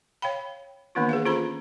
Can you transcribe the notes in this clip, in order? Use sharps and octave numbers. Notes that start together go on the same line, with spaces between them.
C#5 F5 G5 B5
D#3 E3 A#3 B3 D4 F4
G#4 B4 F5
C#4 F4 A4 C5 A#5 B5